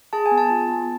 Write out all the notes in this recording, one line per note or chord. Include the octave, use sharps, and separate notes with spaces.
G#4 A5
G#5
B3
A5
F4
B3